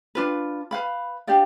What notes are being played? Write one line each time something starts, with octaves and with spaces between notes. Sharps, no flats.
D4 F4 B4
B4 F5 B5
D4 G4 D5 F5